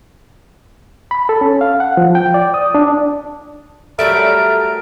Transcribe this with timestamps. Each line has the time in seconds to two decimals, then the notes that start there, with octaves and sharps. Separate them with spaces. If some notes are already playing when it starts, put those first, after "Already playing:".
1.11 B5
1.29 A4
1.41 C#4
1.61 F5
1.80 F#5
1.97 F3
2.15 G5
2.34 D5
2.54 D#6
2.75 D4
3.99 F#3 G3 A3 A#4 E5 D7